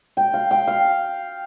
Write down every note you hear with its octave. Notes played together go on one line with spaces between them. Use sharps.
G5
F5
G5
F5